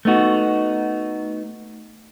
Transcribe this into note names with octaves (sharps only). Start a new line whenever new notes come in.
A3 B3 D#4 F#4